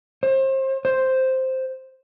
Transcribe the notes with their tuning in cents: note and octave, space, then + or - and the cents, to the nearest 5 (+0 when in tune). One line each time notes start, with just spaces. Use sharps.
C5 +30
C5 +0